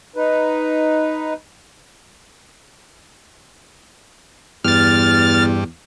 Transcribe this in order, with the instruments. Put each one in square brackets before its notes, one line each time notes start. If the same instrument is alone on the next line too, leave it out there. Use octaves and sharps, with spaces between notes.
[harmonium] D#4 B4
[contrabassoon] E2 [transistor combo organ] G2 [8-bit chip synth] F6 A6